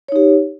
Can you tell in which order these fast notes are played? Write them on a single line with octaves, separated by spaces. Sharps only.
C#5 D#4 G4